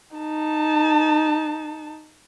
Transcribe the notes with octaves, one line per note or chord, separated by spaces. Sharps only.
D#4 A5